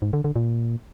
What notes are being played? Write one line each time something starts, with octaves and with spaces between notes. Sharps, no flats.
G#2
D3
D3
A#2